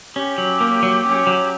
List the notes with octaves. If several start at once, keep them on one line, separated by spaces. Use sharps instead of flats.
C#4 G4
F#3
A#3
F#3
C#4
F#3